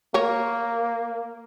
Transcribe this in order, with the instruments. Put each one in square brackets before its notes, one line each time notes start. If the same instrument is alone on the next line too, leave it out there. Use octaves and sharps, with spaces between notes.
[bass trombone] A#3 [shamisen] A#4 C#5